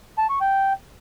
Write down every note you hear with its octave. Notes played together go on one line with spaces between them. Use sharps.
A5
C#6
G5